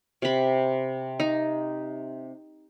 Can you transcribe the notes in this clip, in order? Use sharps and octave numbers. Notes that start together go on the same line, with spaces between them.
C3 B5
D#4